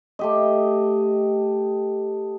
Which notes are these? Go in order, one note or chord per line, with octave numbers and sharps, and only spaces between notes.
A3 G4 D#5